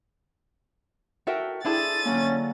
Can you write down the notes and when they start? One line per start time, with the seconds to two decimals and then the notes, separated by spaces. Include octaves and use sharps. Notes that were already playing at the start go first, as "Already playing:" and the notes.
1.27 F#4 A4 A#4 E5 G5
1.65 D4 E4 F4 G#4 A4 A5 A6 D#7
2.05 D3 F#3 A#3 C#4